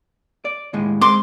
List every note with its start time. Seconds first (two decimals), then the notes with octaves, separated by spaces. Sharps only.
0.45 D5
0.73 D#2 A2 G#3
1.01 G#3 C4 C6 D6